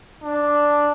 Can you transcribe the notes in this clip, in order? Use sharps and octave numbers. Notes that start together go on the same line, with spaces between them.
D4